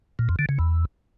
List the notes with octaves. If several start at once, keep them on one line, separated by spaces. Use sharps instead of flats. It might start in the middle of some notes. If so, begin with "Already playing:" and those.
A#2
F2
D3
C#3
E2